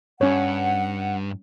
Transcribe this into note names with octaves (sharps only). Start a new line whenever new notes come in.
G2 C#4 C#5 F#5